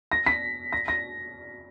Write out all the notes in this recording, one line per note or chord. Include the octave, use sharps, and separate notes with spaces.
A#6
B6
A#6
A#6